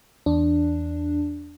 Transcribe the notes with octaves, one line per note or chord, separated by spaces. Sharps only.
E2 D4